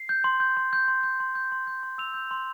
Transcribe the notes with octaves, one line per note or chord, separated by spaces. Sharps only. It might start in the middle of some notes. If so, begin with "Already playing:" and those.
Already playing: C7
G6
C6
G6
C6
G6
C6
G6
C6
G6
C6
G6
C6
E6 F7
G6
C6